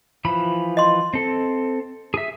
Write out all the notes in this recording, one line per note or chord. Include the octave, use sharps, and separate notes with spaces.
E3 F3 B5
D#5 C6
C4 A4
G#4 E5